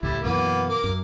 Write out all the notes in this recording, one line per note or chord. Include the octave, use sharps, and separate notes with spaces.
C#2 A2 G3 E4
F#2 B2 E3 A#3 B3
A#4 D6
F#2